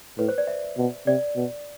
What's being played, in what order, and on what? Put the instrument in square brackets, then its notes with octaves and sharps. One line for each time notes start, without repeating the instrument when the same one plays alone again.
[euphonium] A2 [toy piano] B4
[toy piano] C5
D5
E5
[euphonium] B2
[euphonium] C3 [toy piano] D5
[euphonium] B2